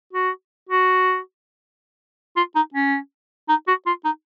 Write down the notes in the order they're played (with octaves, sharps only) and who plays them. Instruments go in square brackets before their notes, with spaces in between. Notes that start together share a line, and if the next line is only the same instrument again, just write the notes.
[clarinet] F#4
F#4
F4
D#4
C#4
D#4
F#4
F4
D#4